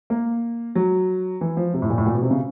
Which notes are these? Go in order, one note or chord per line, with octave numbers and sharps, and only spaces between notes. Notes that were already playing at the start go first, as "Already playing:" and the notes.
A#3
F#3
E3
F3
C3
A2
A#2
A2
A#2
B2
C3
C#3